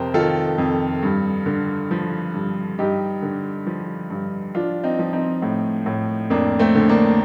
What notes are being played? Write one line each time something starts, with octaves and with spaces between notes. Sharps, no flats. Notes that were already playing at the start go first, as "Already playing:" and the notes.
Already playing: F2 C3 G4 A#4 C5
D#3 F4 A4
F2
G2
D3
F3
G2
G2 D#4 G4
D3
F3
G2
F3 D4 F4
C4 D#4
F3
C4 D#4
A2
A2
F2 A#3 D4
A3 C4
D3
A#3 D4